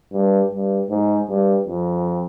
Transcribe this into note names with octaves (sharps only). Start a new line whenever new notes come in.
G2
G2
G#2
G2
F2